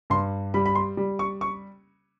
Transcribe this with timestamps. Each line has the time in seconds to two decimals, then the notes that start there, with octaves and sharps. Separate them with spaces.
0.10 G2 C6
0.54 G3 B5
0.66 B5
0.75 C6
0.97 G3
1.19 C#6
1.41 C#6